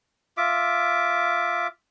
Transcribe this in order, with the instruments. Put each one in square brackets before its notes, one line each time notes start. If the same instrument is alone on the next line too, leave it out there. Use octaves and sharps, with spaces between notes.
[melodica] F4 E5 D6